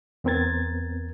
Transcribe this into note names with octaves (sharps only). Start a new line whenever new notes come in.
E2 B3 C4 A#4 G#6 A6